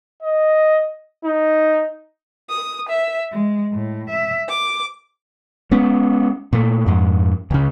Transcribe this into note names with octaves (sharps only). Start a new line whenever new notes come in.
D#5
D#4
D#6
E5
G#3
A2
E5
D6
G#3 B3 C#4
A#2 A3
F2 G#2
C#2 C#3